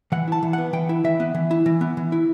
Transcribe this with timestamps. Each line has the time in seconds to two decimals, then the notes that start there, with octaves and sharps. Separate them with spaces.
0.12 E3 F#5
0.28 E4 A5
0.43 E3
0.53 B3 F#5
0.73 E3 G5
0.89 E4
1.04 E3 E5
1.20 B3
1.34 E3
1.51 E4
1.66 E3
1.81 B3
1.97 E3
2.12 E4